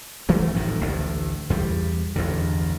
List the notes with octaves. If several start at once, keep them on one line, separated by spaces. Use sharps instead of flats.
E3 F#3 A3
A1 F2 A2 D#3
A1 D2 A2
E2 G3
A1 E2 G2 D3